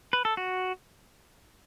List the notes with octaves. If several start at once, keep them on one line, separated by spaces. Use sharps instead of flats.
B4
A4
F#4